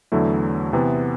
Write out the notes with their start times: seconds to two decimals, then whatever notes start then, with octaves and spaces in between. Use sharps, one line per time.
0.12 E2 D3 F#3 A3 E4
0.73 C3 E3 B3